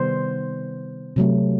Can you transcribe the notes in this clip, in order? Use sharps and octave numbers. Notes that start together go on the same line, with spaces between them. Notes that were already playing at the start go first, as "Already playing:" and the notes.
Already playing: C3 D#3 G3 B3 C5
C3 F#3 A3